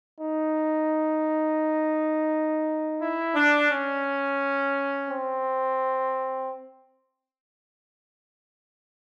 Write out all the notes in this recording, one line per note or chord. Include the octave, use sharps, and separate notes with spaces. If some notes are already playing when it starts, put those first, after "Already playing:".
D#4
E4
D4
C#4
C4